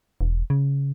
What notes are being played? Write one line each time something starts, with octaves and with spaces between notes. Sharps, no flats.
E1
C#3